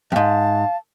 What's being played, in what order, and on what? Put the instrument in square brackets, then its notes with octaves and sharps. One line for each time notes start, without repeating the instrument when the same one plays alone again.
[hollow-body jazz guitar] F2 G#2 [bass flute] F5 [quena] A5